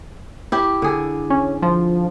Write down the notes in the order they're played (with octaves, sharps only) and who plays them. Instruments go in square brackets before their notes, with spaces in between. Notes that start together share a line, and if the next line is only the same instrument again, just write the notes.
[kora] E4 G4
D3 G#4
[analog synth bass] C#4
F3